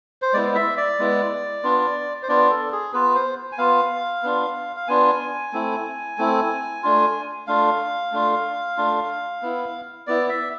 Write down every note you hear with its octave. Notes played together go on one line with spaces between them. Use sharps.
C5
G#3 B3 E4 D5
E5
D5
G#3 B3 E4
B3 D4 F4
C5
B3 D4 F4 D5
A4
G#4
B3 F4 B4
C5
G#5
B3 F4 F5
B3 D4 F4
F5
B3 D4 F4 G#5
A3 C4 E4
A3 C4 E4
A3 D4 F4
A3 D4 F4 F5
A3 D4 F4
A3 D4 F4
B3 E4
B3 E4 D5
E5